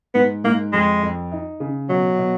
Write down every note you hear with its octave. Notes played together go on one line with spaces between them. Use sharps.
G#2 B3
G#2 A#3
F2 G#3
F2
D#4
C#3
B2 F#3
B2